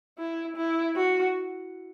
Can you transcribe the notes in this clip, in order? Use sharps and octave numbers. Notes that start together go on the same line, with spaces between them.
E4
E4
F#4